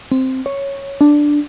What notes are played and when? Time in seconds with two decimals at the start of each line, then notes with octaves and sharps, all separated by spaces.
0.12 C4
0.46 C#5
1.01 D4